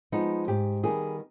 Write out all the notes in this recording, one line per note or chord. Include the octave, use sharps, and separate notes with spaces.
F3 G#3 B3 D#4
G#2 G4
D#3 G3 B3 G#4